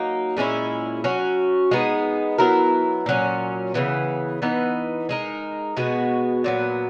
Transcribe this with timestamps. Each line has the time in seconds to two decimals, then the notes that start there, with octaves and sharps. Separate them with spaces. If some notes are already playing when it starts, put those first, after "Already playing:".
Already playing: F#3 A#3 D#4
0.37 A#2 G#3 C#4 E4
1.04 F#3 C#4 F#4
1.71 G#3 B3 D#4
2.38 F#3 B3 E4 A#4
3.06 A#2 F#3 C#4
3.74 C#3 E3 B3
4.42 E3 B3 D#4
5.09 G#3 D#4 A#4
5.77 B2 G#3 B3 F#4
6.44 A#2 F#3 B3